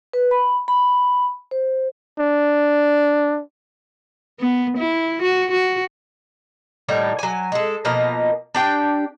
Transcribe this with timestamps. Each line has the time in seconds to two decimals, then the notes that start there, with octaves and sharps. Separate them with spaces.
0.13 B4
0.31 B5
0.68 B5
1.51 C5
2.19 D4
4.40 B3
4.77 E4
5.22 F#4
5.51 F#4
6.88 A2 D#3 G3 A#3
7.19 F#3 G#5
7.52 G#3 A4
7.85 B2 F3 A#3 D#5
8.55 D4 G4 G5